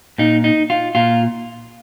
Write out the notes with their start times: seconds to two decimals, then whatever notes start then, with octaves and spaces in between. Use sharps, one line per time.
0.18 A#2 D#4
0.44 D#4
0.70 F4
0.95 A#2 F4